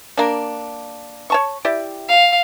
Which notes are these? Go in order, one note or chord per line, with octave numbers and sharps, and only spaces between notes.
A#3 D4
C#5 A5 C#6
E4 G4 D5
F5